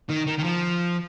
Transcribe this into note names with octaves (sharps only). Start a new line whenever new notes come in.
D#3
D#3
D#3
F3